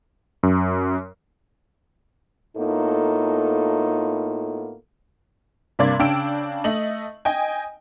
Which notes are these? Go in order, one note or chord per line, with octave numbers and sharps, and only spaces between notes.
F#2
A2 A#3 B3 D#4 F4 A4
G2 C3 A#3 D5 C6 G#6
C#3 D4 G5 E6 D7
A3 D#5 F#7
D#5 G5 G#5